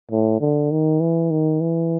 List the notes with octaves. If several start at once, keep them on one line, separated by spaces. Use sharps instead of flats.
A2
D3
D#3
E3
D#3
E3